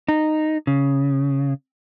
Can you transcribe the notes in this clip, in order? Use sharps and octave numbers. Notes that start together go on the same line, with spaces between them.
D#4
C#3